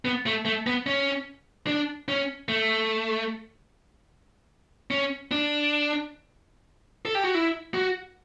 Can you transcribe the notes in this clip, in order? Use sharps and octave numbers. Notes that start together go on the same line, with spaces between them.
B3
A3
A3
B3
C#4
D4
C#4
A3
C#4
D4
A4
G4
F#4
E4
F#4